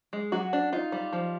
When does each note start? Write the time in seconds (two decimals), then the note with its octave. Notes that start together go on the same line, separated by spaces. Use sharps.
0.13 G#3
0.32 F#3 F#4
0.53 D4
0.73 D#4 F4
0.92 G3
1.13 F3